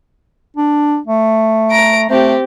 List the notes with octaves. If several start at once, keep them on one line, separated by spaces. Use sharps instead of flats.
D4
A3
A#5 D7
A3 C4 G4